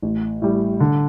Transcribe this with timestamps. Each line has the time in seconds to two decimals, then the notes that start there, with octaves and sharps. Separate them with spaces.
0.02 A1
0.42 A2 G3
0.80 D3